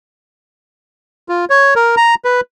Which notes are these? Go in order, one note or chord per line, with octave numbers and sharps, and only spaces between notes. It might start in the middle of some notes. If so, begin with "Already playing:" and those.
F4
C#5
A#4
A#5
B4